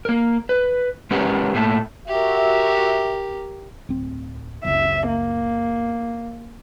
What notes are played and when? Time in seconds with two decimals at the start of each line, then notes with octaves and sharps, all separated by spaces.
0.05 A#3 A#4
0.49 B4
1.11 G#3 C#4 G4 A#4 B4 F#5
1.54 A2 A3 A#3 E5 A5
2.08 F#4 G4 A#4 E5
3.89 D1 C4
4.65 F#1 C#2 E5
5.08 A#3